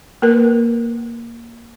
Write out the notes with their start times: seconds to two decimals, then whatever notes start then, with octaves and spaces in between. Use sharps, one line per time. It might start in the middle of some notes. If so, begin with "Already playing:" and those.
0.22 A#3 A#4 B4